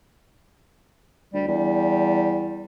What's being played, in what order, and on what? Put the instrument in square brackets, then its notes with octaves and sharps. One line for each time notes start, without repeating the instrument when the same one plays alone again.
[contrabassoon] D2 [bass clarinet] G3
[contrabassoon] E2 [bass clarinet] G3